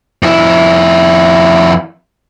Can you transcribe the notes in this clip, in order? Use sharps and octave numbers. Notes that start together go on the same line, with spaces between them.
F2 E4